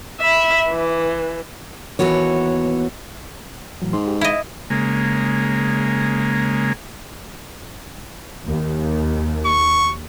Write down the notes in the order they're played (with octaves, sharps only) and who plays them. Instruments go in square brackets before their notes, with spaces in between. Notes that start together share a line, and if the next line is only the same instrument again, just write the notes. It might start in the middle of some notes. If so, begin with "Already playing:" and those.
[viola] E5 B5
E3
[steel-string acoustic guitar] D#2 E3 B3 F#4 C#5
[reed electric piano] A2 E3 F#3
[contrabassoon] G#2 [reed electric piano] C6
[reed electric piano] G4
[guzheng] E4 D#5 [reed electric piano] F5
[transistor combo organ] C#3 G#3 A#3
[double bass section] D#2
[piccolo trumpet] C#6